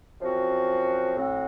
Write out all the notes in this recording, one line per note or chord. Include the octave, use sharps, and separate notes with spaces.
F#2 F3 C4 F#4
A2 F#3 C4 F#4